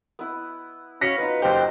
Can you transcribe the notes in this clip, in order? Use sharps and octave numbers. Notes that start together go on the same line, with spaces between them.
B3 E4
C#4 F#4 F5 A#6 B6 C#7
B3 D#4 F4 B4
F#1 B3 G4 C5 G5